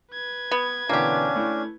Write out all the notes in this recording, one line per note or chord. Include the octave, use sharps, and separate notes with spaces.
B4 G#6
B3
B2 D3 E3 A#3 C#4 D4 G4
A3 E4